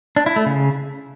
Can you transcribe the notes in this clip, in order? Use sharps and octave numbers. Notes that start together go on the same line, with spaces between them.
D4
E4
A3
C#3